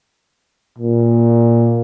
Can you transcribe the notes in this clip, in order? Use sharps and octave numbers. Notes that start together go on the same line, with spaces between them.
A#2